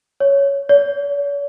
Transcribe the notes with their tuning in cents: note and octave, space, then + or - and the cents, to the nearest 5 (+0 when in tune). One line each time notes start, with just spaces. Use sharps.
C#5 +5
C#5 +45